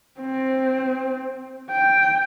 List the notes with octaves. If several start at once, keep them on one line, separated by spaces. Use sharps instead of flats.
C4
G5